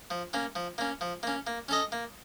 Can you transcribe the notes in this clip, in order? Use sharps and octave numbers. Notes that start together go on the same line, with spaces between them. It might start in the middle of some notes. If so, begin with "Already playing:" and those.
F3
A#3 C#4
F3
A#3 C#4
F3
A#3 C#4
A#3
C#4 A4 D#5
A#3